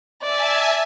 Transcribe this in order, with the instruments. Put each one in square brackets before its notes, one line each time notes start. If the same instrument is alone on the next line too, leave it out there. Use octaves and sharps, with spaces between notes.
[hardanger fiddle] D5 [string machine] E5 G#5 A5